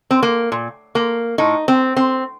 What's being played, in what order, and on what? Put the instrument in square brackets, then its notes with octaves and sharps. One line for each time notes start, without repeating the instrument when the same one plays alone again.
[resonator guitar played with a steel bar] C4
A#3
A#2
A#3
A2 D#4
C4
C4